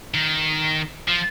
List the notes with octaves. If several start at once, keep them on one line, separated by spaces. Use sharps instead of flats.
D#3
F3